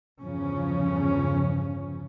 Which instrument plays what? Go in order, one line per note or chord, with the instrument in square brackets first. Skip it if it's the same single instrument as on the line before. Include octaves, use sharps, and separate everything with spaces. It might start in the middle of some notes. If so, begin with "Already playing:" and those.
[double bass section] G1 E2 C#3 F3 C#4